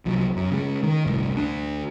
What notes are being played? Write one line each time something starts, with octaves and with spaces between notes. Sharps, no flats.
C2 F3 F#3
F#2
C#3 G#3
D#3
G1 C2 A2
D2 D4